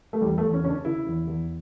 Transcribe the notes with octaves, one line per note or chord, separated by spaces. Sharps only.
A3
E2 G3
A3
E2
C#4
C#3 C#4
D4
C#3 E4
E2
E2